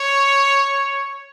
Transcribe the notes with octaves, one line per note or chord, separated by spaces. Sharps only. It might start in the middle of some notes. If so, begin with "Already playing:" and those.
Already playing: C#5